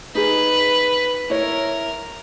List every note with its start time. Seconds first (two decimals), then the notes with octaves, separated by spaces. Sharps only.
0.15 D#4 G#4 B4
1.30 E4 A#4 C#5